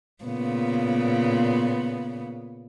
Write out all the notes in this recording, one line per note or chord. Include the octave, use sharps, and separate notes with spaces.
A#2 C#3 B3